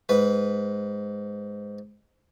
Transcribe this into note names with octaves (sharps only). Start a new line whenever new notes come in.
G#2 B4